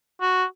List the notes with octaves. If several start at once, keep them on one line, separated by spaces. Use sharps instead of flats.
F#4